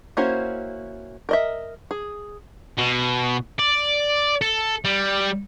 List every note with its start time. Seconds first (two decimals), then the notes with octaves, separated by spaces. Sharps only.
0.17 A#3 C#4 E4 F#4 C5
1.29 A#4 D#5 E5
1.91 G#4
2.77 B2
3.59 D5
4.42 A4
4.85 G3